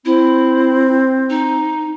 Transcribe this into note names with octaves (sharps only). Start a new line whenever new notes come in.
C4 E4
D#4